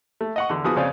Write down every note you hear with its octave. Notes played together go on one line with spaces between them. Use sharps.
A3
D#5 F#5 C#6
E2 D3
F3 B3 F#4 G#4 B4 D#6
F2 C#3 C#4 C5 D5 F5